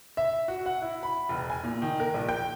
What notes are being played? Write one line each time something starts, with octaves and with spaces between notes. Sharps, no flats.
E5
F#4
F#5
E4
B5
E1
G#5
A#2
D#3
A#4
A#1
G5